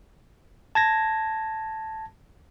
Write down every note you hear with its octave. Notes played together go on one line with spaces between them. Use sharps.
A5 G#6 A#6